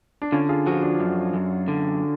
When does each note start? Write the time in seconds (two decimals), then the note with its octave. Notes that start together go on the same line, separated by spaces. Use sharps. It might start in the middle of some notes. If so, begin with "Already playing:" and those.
0.22 D4
0.32 D3 C#4 F4
0.49 F4 G#4
0.66 F3 F#4 A4
0.83 D4 F#4
1.00 F#2
1.34 F#2
1.68 D3